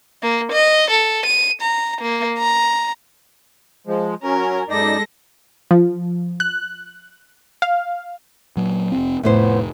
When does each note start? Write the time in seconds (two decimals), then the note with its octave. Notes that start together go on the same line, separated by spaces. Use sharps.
0.22 A#3
0.52 D#5
0.91 A4
1.26 D#7
1.62 A#5
2.02 A#3
2.38 A#5
3.87 F3 G#3
4.23 F#3 C#4 A#4
4.69 F#2 G#3 D#4 A4 D5 A#6
5.71 F3
6.40 F#6
7.62 F5
8.57 A#2 F#3
8.92 F1 C4
9.23 F1 A2 B3 C5